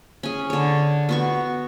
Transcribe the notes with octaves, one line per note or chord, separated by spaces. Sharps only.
C#4 G#4
D3 C#5
B3 F#4 C#6